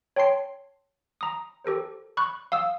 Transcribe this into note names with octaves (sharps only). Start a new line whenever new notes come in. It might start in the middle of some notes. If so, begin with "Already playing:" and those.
C#5 G5 A5 C6 C7
A#5 D#6
G4 A4 A#4 C5
B5 C#6 F#6
F5 D#6 E6